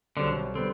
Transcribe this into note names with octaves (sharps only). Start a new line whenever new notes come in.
B1 B2 D3 G3 C4 D4
D3 G3 B3 C4